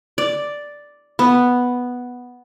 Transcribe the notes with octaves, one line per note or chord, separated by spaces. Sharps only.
D5
B3